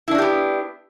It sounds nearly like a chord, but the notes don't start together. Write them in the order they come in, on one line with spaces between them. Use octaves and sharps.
E4 D4 F#4 G4 B3